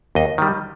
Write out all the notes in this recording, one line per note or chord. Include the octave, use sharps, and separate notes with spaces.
D#2 D#5
D#3 G3